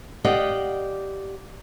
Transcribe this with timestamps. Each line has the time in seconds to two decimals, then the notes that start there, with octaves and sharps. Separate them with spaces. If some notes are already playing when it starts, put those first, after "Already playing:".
0.24 G4 D5 D#5 F5 F#5